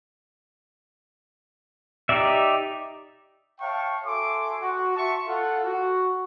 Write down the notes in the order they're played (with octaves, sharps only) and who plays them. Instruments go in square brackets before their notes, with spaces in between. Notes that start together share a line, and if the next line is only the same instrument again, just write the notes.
[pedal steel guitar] D#4 G4 D5 E5
[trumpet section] C#5 E5 F5 G5 A5 C#6
F#4 A4 E5 G#5 C6 D6
F#4
E5 A5 C6 C#6
F4 A4 F#5
F#4